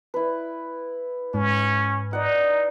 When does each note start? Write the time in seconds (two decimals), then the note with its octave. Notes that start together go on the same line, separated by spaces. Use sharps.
0.14 E4 B4
1.34 G#2 C#4
2.13 D#4 D5 F#5